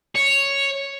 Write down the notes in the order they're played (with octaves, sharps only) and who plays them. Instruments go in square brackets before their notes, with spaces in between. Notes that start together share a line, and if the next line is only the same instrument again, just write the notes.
[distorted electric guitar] C#5